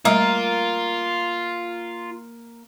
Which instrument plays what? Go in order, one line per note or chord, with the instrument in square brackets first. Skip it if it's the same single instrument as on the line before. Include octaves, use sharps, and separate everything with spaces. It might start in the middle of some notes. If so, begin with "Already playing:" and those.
[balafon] G3 A3 E5 [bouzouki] A#3 [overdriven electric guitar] F4